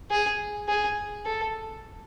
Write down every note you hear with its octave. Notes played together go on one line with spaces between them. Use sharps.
G#4
G#4
A4